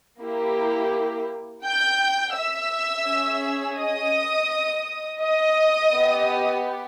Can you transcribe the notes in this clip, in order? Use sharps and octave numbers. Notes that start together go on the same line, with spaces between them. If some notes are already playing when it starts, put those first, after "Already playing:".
A#3 E4 G4
G5 G6
E5 E6
C#4 G#4
D#5 D#6
D#5 D#6
B3 G4